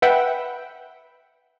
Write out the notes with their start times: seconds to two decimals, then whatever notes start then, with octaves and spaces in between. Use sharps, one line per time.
0.02 B4 E5 F#5 G5 B5